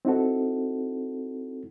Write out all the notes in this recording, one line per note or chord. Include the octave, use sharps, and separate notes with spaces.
C4 D#4 E4 F#4 A4